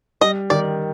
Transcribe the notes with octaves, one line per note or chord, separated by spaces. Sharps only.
G3 D#5
D#3 D5